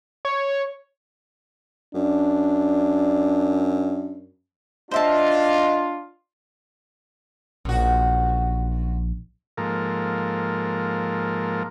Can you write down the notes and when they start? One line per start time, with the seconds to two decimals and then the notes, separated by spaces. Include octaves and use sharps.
0.25 C#5
1.95 F#2 D4
4.91 D4 F4 C5 D#5 E5 A5
7.65 A#1 F#2 F#4
9.58 G#2 F3 A#3 A4 A#4